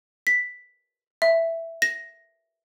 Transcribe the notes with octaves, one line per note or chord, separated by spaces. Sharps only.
B6
E5
A#6